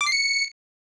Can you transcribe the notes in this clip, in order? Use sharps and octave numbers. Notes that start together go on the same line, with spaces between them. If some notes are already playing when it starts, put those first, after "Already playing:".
D6
C7
C#7